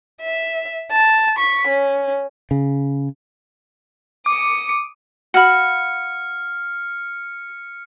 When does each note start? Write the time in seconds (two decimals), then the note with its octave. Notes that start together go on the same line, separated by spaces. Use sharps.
0.21 E5
0.92 A5
1.38 C#6 B6
1.68 C#4
2.51 C#3
4.26 D6 D#6 C#7
5.34 F#4 F5 B5 F6 C#7